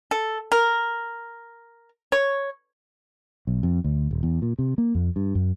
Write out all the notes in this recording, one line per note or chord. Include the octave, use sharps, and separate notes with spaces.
A4
A#4
C#5
B1
F2
D2
D#1
E2
A#2
C3
A#3
F2
G2
F#2